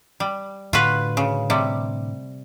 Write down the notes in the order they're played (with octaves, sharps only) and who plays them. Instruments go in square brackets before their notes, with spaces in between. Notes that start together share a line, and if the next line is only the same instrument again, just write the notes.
[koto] G3
[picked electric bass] A2 D3 [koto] F4 F#4 B4
[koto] C#3
C3 G3